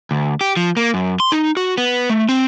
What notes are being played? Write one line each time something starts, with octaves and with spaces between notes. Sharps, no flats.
D2
G4
F3
A#3
F#2
C6
D#4
F#4
B3
A3
C4